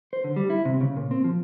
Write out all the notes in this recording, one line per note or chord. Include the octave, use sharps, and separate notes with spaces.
C5
D3
G3
E4
C3
C#3
A#2
C4
F3